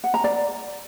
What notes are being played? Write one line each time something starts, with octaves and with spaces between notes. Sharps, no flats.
F#5
A#5
D5